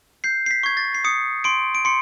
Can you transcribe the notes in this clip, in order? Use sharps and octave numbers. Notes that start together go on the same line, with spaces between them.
G6 C7
C7
B6
C#6 G#6
A6
C7
D#6 C#7
C6 D7
D7
C6 C#7